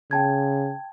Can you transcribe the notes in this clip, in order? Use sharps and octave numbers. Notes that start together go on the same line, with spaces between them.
C#3 G5 A5 G#6